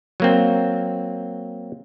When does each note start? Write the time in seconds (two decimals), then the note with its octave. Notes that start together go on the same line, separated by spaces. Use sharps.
0.20 F#3 A#3 C4